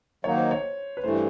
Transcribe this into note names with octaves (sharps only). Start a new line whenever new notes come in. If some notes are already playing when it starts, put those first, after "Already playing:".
D#3 F#3 A#3 D#4 C#5
C5
C#5
B4
G2 E3 A3 C5